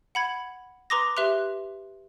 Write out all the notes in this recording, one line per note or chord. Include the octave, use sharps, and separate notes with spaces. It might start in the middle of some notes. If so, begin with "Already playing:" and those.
F#5 B5 G#6
B4 A#5 C6 D6 D#6 A#6
G4 B4 E5 C6 F#6 F7